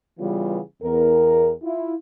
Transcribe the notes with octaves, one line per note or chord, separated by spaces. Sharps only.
C#3 E3 G3 B3 F4
E2 A#4
E4 F4